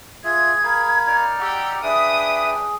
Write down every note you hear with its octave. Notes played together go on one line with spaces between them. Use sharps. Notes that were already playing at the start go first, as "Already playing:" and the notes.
F4 G#4 E5 G#6
A#4 F5 B5
D#4 D5 F6
G4 F#5 E6
D4 G#4 B4 E5 G5 D#6